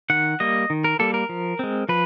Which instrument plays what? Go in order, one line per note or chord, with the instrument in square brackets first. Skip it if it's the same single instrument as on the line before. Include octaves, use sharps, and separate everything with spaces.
[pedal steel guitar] D#3 F#5
G3 A#3 D#5
D#3
A#4
G3 A#3 A4
A#4
F3
G#3 C4
F3 B4